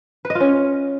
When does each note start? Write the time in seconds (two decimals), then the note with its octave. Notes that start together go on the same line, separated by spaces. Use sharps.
0.25 B4
0.30 D#5
0.35 F4
0.40 C#4